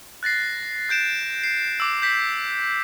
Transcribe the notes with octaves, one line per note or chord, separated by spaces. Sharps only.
F#6 A6 A#6 C7
F#6 G6 D7 E7
C7
D6 E6
G6 B6